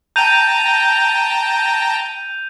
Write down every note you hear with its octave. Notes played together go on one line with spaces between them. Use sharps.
G5 A5 A#5 G6 D#7 F7